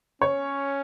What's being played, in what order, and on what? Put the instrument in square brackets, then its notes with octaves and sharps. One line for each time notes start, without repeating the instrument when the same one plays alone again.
[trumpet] C#4 [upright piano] C#5